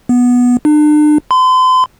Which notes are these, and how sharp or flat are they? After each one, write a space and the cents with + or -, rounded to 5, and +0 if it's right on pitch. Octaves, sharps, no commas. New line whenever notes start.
B3 -10
D4 +40
C6 -40